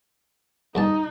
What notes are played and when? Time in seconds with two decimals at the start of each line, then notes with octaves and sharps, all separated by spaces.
0.75 E2 G2 D#4 A5